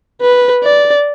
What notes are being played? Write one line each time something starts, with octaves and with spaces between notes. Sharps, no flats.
B4
D5